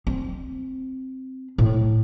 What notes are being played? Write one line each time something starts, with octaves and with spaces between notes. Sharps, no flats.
C4
A2